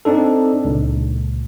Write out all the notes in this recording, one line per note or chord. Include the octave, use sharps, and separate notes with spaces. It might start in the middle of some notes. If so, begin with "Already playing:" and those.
C4 D4 D#4 A4
C#2 A#2